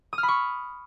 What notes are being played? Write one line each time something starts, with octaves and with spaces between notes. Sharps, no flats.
D#6
F6
B5
C#6